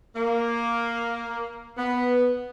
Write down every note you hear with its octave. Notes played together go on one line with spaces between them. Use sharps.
A#3
B3